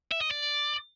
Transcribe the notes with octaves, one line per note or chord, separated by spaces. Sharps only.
E5
D#5
D5